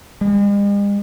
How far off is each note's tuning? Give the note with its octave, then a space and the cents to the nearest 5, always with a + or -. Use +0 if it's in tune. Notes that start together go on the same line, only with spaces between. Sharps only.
G#3 -45